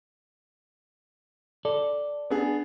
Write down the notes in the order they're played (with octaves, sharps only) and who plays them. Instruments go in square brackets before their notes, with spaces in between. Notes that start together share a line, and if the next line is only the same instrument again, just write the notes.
[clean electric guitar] A4 D5
[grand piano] B3 D4 G#4